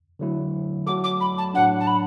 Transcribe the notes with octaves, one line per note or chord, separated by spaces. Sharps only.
D3 F#3 A3 E4
F#3 A3 F#4 A4 D6
D6
B5
A5
A2 F#3 D4 F#5
A5
B5